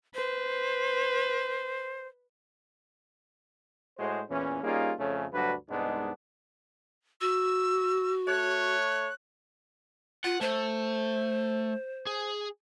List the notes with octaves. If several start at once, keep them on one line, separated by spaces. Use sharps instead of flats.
B4 C5
A2 G#3 F#4 G#4 C5
E2 A#2 E3 C#4
G3 A#3 C#4 D#4 F4 G#4
F2 C#3 A3 C#4
D2 G2 F#3 D4 F#4 B4
C2 G#2 G#3 B3 D4 D#4
F#4 E6
A3 C#5 F#6
F4 F#5
A3 C5
G#4